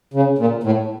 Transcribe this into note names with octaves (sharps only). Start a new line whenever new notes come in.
C#3
A#2
A2